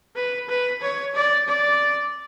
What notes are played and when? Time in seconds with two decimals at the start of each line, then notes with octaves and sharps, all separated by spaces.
0.16 B4
0.49 B4
0.82 C#5
1.15 D5
1.48 D5